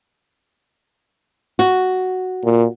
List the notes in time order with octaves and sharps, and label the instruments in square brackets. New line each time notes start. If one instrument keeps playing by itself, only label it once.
[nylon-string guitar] F#4
[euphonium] A#2